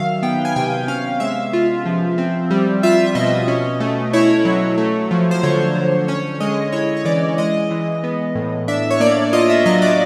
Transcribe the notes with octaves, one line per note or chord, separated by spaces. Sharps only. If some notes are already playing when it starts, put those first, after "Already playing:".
Already playing: D#3 F#3 E5 F5
B3 G5
G#5
C3 G5
C#4 F5
G#3 E5
F4
F3
C4
G3
F4 E5
B2 D#5
C#4
A3
E4 C#5
F#3
A3
F3
C5
D3 C#5
D3
C#4 C#5
G#3 D#5
E4 C#5
C#5
E3 D5
G#3 D#5
E3
B3
A2
D4 E5
C#5
A#3 D5
F4 D#5
E5
F#3 D#5
D5